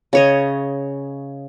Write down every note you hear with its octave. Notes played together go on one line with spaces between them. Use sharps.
C#3 C#5 D#5